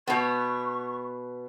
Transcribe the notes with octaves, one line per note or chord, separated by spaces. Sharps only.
B2 B3 C#6